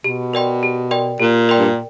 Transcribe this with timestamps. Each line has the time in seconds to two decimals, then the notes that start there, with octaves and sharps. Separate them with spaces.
0.04 B2 G4
0.33 A#4 D5 G5 C6
0.63 G4
0.91 A#4 D5 G5 C6
1.20 A#2 G4
1.49 A#4 D5 G5 C6
1.60 G2